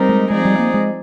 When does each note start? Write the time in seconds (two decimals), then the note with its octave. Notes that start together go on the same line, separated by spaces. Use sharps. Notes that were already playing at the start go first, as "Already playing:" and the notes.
Already playing: G3 C4 D#4 A#4
0.09 G#3
0.30 F3 G#3 C4 D#4 G#4 D5
0.45 G3
0.59 A#3
0.74 G#3